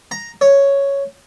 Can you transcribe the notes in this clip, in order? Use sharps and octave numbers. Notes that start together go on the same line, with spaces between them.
A#5
C#5